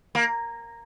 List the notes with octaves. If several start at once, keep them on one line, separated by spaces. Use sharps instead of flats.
A#3